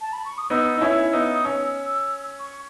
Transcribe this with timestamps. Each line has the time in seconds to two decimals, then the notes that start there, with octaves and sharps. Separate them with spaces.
0.00 A5
0.13 B5
0.25 C#6
0.38 D#6
0.50 B3 D#4 E6
0.77 D#4
0.81 C#4 E4
1.13 B3 D#4
1.34 D#6
1.45 C#4 E6
2.39 C#6